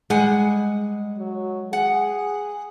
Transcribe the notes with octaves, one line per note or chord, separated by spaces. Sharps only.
G3 G#3 F#5 G#5
F#3
G#4 F#5